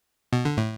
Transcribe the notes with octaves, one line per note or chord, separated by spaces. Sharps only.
B2
D3
A2